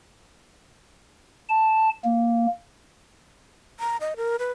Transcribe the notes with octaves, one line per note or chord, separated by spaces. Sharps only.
A5
A#3
A#5
D#5
A#4
B4